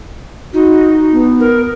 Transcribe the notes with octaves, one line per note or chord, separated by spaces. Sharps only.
D#4 F#4
B3
A#4